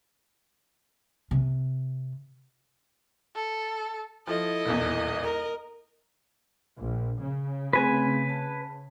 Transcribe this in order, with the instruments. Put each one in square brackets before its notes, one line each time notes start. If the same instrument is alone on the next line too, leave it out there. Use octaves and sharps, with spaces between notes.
[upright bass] C3
[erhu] A4
[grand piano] F3 [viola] E4 A4 [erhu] D#5
[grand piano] D#1 B1 E2
[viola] A#4
[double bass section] A#1
C#3
[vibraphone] A3 C4 G#4 [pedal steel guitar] B4 G#5
[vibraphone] A5